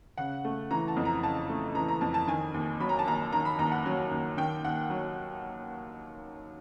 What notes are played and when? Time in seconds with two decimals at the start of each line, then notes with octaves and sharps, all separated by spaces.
0.17 C#3 F#5
0.45 A3
0.71 E3 A#5
0.88 A5
0.97 F2
1.05 A#5
1.23 C#3 A5
1.49 A3
1.75 E3 A#5
1.88 A#5
2.01 F2 A5
2.14 A5
2.27 D#3 G#5
2.54 D#2
2.80 F#3 B5
2.89 A#5
2.99 A5
3.07 D#2 A#5
3.33 D#3 A#5
3.45 B5
3.59 D#2 A#5
3.72 F#5
3.86 F#3
4.11 D#2
4.37 D#3 G5
4.65 D#2 F#5
4.90 F#3